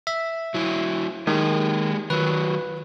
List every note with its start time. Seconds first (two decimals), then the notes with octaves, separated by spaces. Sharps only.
0.07 E5
0.54 F#3 E4
1.27 D#3 G#3 G4 G#4
2.10 D#3 F#3 B4